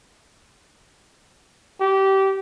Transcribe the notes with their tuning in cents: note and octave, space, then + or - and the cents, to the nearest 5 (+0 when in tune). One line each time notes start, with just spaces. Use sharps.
G4 -20